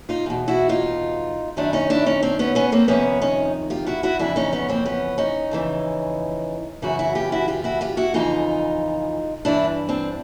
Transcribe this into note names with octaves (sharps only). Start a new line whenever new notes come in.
D#4 F4
E2 B2
E4 F#4
D#4 F4
F#2 D#3 D4 E4
C#4 D#4
D4 E4
C#4 D#4
C4 D4
B3 C#4
B3 C#4
A#3 C4
F2 C3 D#3 B3 C#4
C#4 D#4
F4 G4
E4 F#4
E4 F#4
F2 C#3 E3 D4 E4
C#4 D#4
B3 C#4
A#3 C4
B3 C#4
C#4 D#4
F2 C#3 E3
F#2 C#3 E3 E4 F#4
E4 F#4
F4 G4
E4 F#4
F4 G4
E4 F#4
F4 G4
E4 F#4
F2 C#3 E3 D#4 F4
G2 E3 D4 E4
C4 D4